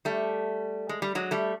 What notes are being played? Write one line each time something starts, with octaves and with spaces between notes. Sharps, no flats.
G3 A3
G#3
G3
F#3 G#3
G3 A3